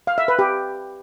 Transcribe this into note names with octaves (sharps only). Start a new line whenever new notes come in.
F5
E5
B4
G4